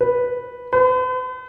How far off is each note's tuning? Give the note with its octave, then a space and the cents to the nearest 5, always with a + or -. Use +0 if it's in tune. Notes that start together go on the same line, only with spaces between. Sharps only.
B4 -5
B4 +45